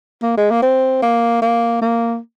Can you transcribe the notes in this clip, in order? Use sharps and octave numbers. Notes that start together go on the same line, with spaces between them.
A#3
G#3
A#3
C4
A#3
A#3
A#3